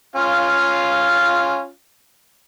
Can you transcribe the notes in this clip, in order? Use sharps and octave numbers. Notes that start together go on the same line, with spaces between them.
C#4 F4 F5